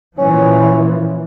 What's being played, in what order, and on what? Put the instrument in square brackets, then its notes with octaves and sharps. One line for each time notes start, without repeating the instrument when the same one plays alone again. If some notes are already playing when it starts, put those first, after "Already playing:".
[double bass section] A#2 E3 F3 [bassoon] C#4